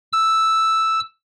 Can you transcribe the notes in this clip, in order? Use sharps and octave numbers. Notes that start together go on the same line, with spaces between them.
E6